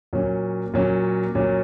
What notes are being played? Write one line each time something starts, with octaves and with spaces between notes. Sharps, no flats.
A#2 F#3 C#4
A#2 F#3 C#4
A#2 F#3 C#4